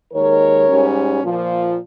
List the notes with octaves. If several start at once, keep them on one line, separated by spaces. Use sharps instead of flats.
D#2 D#3 G#3 A#4 C#5
G#2 G3 C#4
A#2 F3 A#3